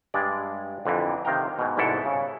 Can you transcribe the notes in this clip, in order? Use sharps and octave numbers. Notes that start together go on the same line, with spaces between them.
G2 G#3 D5
F2 D3 E3
C3 D#3 F5 G5 A#5
G#2 B2
C2 G#2 B2 E4 A4
C#3